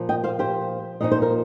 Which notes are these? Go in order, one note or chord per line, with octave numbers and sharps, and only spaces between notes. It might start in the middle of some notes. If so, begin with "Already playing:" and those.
Already playing: A#2 F3 A#3
D#5 G5
C5 F5
G4 C5
A#2 F3 D#4 D#5
C5
A#4